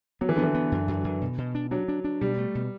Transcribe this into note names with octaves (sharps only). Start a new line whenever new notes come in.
F#3 B3
E3
D3 B3
E3
B3
F#2
F#2
F#2
B2
B2
D4
F#3 D4
D4
D4
B2 G3
A3
B2